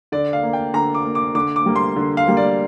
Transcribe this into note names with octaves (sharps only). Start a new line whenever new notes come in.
D3 D5
F5
A#3
G5
D3 A#5
D6
A#3
D6
D3 D6
D6
G3 A#3
C6
D3
F5
G3 A#3
D5